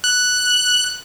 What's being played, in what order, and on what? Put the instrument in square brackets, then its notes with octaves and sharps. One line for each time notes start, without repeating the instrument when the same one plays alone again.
[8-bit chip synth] F#6